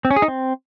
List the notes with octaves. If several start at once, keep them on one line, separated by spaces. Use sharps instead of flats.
C4
C#4
G#4
D#4
C4